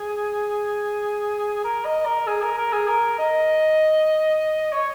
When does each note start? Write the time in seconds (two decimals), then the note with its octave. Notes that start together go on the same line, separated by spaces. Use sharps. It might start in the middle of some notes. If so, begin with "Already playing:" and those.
Already playing: G#4
1.64 A#4
1.85 D#5
2.05 A#4
2.27 G#4
2.42 A#4
2.57 A#4
2.72 G#4
2.88 A#4
3.19 D#5
4.72 C#5